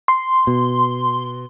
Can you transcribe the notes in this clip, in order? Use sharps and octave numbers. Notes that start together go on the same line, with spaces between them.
C6
B2